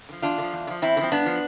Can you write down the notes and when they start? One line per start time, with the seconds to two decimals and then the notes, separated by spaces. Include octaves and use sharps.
0.09 D3
0.12 F3
0.22 E2 D4 F4
0.38 D3
0.43 F3
0.52 E2
0.67 D3
0.70 F3
0.82 E2 C4 E4
0.97 D3
1.01 F3 C4
1.11 G2 B3 D4
1.26 F3